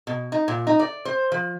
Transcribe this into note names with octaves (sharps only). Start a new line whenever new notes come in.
B2
D#4
A#2
D#4
D5
C5
F3